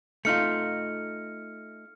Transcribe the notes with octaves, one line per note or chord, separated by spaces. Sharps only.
A3 D#4 F4 F6 C#7